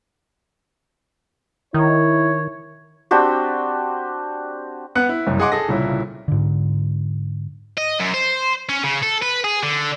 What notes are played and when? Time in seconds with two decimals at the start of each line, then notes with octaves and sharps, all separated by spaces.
1.74 D#3 E4 C#5
3.11 C4 D4 F#4 G4
4.95 B3 F#5 F#6
5.09 E4
5.26 F#1 C2 F#2
5.39 G#4 D#5 F#5 C6 D6
5.52 G#4 A4 A#6
5.68 C2 A#2 C#3 E4
6.28 G#2 D3
7.77 D#5
7.99 F#2
8.14 C5
8.69 C#4
8.84 C#3
9.03 A4
9.22 B4
9.44 G#4
9.63 D3